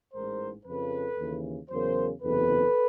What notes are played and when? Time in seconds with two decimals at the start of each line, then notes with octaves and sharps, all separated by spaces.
0.13 A1 G#2 E3 G#3 A#4 C5
0.66 F2 C#3 F3 A4 B4
1.18 D#2 C#3 E3
1.70 E2 C#3 F#3 A#4 C5
2.22 F#1 E2 C3 A4 B4